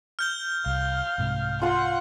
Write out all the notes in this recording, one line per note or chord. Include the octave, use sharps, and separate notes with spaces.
F6 G6 G7
C2 F5
C2 G#2 C3
F4 F5 F#5 C6